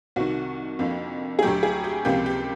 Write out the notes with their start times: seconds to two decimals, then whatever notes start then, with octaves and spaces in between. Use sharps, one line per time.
0.16 C2 C3 D#3 F#4
0.79 F2 D3 F3 A#3
1.39 G#4
1.42 D2 D3 F#3 A3 G4
1.63 G#4
1.84 G4
2.05 C#2 C3 F3 A#3 G4
2.26 G4